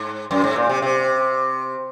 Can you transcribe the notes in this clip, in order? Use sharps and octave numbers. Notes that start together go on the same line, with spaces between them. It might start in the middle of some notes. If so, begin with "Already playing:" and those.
Already playing: G#2
F#2
G#2
A#2
C3
C3